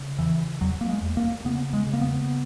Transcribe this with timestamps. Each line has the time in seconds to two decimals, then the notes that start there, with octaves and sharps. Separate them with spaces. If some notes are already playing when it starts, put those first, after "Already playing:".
Already playing: C#3
0.19 E2 E3
0.61 E2 F#3
0.81 A#3
0.89 G#3
1.03 E2
1.17 A#3
1.45 C#3 B3
1.73 G#3
1.87 C#3
1.93 A#3
2.01 B3